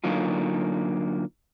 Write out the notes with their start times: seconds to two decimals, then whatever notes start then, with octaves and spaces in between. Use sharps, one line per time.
0.04 D3 F#3 A#3 D#4 F4